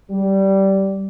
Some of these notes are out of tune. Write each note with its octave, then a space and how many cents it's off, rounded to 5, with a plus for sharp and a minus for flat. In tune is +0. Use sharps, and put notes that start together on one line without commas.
G3 -15